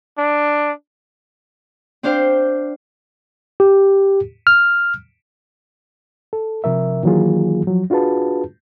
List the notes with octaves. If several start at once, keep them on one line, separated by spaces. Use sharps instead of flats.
D4
C4 D4 C5 F5 G5
G4
F6
A4
C3 F3 A#4 E5
D#3 E3 F#3 A#3 F4 G#4
F3 F#3
D4 F4 F#4 G#4 B4 A5